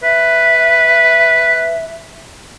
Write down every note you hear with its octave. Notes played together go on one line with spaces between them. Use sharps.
B4 E5